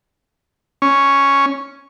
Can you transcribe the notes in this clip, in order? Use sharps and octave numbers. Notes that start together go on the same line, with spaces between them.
C#4